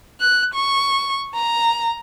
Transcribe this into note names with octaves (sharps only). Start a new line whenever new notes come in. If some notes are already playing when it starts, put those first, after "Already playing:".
F#6
C#6
A#5